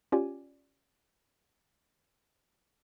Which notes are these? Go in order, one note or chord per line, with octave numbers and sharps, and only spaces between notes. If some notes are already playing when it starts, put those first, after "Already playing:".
C#4 F4 G4 D5 G#5